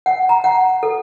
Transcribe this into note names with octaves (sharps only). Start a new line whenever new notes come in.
F#5
A#5
F#5
A4